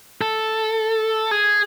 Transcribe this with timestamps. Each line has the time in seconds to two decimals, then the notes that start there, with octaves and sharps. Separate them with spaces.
0.21 A4
1.31 G#4